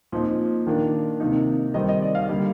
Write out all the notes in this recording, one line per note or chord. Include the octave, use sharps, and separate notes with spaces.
A#2 F3 C4 D#4
D#3 A#3 D4
C3 D#3 A#3 D#4
D#3 G3 C4 D#4 D#5
D#5
D5
F5
D3 G3 A#3